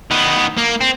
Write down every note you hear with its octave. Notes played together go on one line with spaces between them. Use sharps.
D#3 B3
A#3
C4